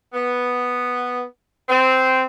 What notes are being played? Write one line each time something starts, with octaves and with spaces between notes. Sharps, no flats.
B3
C4